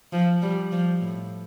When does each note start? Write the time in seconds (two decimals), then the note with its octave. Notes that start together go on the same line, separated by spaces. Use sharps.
0.13 F3
0.42 G3
0.72 F3
1.02 A2